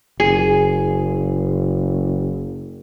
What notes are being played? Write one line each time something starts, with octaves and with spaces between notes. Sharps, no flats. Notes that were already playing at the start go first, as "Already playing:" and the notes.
F#1 G#4